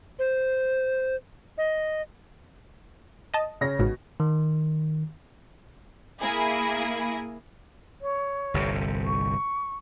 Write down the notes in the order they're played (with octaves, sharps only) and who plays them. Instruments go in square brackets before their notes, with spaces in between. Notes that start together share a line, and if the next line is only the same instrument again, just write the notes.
[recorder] C5
D#5
[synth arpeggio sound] D#5 A5
[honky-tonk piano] C#3 C#4 A#6
[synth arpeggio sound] A1 G#2 [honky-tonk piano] B2
[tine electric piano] D#3
[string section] A#3 E4 G#4
[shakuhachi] C#5
[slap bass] G1 C2 C3
[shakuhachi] C#6